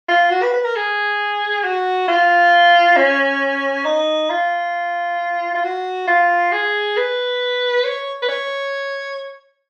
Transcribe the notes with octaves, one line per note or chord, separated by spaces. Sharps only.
F4
F#4
B4
B4
A#4
G#4
F#4
F4
C#4
D#4
F4
F4
F#4
F4
G#4
B4
C#5
B4
C#5